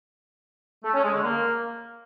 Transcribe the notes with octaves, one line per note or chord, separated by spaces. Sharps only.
A3
C#4
G#3
D3
A#3